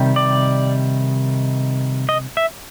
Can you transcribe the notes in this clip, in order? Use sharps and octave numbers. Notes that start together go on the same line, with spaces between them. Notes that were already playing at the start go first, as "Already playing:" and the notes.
Already playing: C3 D#3 G3
D5
D#5
E5